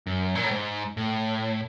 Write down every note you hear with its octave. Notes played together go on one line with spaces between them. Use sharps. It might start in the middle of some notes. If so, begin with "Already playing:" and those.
F#2
A#2
A2
G#2
A2